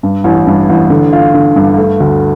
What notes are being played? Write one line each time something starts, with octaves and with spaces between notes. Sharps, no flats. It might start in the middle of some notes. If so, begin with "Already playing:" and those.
G2
A1
G2
A1
D3
F4
D3
G2
A3
D2